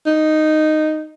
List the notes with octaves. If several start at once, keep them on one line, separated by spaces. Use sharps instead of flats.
D#4